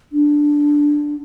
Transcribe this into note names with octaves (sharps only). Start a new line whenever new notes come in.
D4